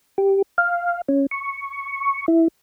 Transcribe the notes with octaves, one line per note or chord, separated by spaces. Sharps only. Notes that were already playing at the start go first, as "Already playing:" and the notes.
G4
F5
C#4
C#6
E4